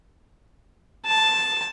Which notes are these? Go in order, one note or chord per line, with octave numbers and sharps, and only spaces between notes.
A5